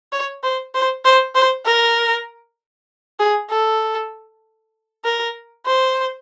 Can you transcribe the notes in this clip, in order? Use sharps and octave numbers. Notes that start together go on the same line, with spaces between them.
C#5
C5
C5
C5
C5
A#4
G#4
A4
A#4
C5